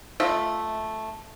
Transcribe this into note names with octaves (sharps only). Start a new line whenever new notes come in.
A3 F4 D#5 E5